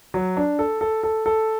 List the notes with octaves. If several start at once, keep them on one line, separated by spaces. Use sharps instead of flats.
F#3
D4
A4
A4
A4
A4